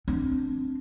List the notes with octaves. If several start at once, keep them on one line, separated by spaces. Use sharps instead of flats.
C4 D4